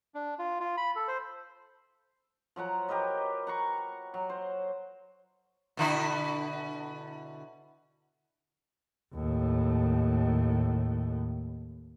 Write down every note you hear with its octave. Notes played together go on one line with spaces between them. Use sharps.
D4
F4
F4
B5
A4
C5
F3 F#3 F#5 A#5
G4 A#4 B4 D#5
F#5 A#5 C#6
F#3
C5
B2 D3 E4
D#2 A2